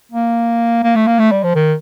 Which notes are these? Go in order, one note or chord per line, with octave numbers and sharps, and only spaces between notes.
A#3
A#3
A3
A#3
A3
G3
F3
D#3